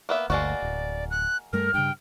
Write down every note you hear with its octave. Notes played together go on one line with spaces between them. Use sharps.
A#3 B3 E5
G1 D2 G#3 A#3 F#4 D5
D1
F#6
G2 G3 A3 A#4 F6
G2 C#3 G5